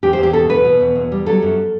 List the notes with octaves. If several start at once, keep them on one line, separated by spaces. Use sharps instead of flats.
E2 G4
C5
E2
G4
B2 A4
E2 B4
B2
E2
E2
G3
F#3 A4
F#2